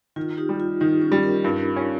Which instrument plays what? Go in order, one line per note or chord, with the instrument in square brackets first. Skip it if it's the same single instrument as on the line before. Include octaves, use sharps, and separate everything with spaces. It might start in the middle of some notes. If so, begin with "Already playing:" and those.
[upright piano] D#3 [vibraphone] F4
[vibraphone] F4
D#4 G4
[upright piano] G3
[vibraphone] F4
[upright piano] D#3 [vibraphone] D#4
[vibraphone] C#4
[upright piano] G3
[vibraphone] G4 A#4
[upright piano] G2
C#4